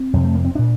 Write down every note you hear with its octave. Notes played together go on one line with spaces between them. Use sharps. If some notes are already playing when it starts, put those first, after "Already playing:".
Already playing: C4
F2 C3
A3
A#3
C4
A#2 D4